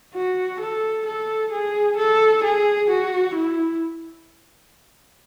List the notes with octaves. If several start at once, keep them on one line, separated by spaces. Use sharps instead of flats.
F#4
A4
A4
G#4
A4
G#4
F#4
E4